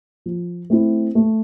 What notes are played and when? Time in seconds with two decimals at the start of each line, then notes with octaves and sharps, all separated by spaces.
0.26 F3
0.70 A3 C4 E4
1.15 A3